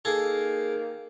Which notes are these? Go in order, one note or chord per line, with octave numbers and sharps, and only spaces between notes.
D#3 A#3 G#4 A4